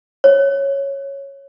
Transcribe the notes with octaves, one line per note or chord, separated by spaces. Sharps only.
C#5